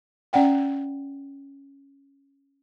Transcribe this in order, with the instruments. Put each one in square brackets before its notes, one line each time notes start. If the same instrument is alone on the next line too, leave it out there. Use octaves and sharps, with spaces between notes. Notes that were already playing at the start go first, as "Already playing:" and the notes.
[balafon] C#4 D5 F#5 G5